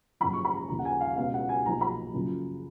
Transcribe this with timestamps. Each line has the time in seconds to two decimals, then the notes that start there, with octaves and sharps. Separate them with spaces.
0.20 F#1 F#2 C#3 F3 B5
0.33 C#6
0.45 B5
0.56 A#5
0.69 D#2 C#3 F3 A#5
0.79 F#5
0.85 G#5
1.00 F5
1.17 C#2 B2 F5
1.34 F#5
1.49 G#5
1.66 B1 A#2 F3 A#5
1.81 B5
2.14 F#1 F#2 C#3 F3